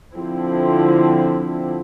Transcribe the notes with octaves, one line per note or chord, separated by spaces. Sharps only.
D3 F3 C4 E4